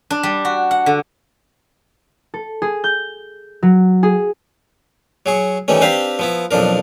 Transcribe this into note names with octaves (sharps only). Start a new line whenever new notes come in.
D4
G3
F#4
F#5
D3
A4
G#4
G6
F#3
G#4
F#3 G#4 C#6
D#3 E3 G3 A3 C#4
C4 D4 G4 B4 C5 F5
F3 B3 E4
B1 F2 F3 D4 A#4